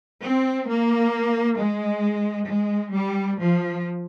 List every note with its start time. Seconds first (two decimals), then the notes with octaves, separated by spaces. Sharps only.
0.22 C4
0.67 A#3
1.58 G#3
2.47 G#3
2.92 G3
3.38 F3